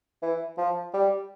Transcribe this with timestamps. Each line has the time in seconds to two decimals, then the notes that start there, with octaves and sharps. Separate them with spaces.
0.22 E3
0.58 F3
0.94 G3